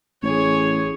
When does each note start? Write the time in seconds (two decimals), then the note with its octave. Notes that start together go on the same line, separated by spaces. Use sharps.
0.22 A1 G#4 C#5